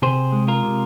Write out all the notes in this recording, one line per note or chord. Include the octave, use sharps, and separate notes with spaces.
C3 G#4 C5
G#3
F4 A#4
C3